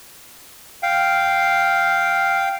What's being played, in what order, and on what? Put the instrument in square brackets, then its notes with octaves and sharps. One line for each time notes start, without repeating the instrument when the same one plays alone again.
[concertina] F5 G5